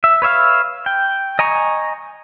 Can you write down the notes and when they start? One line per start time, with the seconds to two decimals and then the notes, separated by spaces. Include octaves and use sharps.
0.04 E5
0.22 B4 C#5 E5 F5
0.86 G5
1.39 D#5 G#5 A#5 C#6